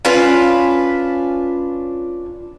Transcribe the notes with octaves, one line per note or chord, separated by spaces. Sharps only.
C#4 D4 F4 B4